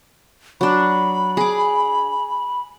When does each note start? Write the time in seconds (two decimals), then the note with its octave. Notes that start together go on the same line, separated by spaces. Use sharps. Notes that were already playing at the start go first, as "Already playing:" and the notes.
0.61 F#3 D4 B5
1.37 G#4 D6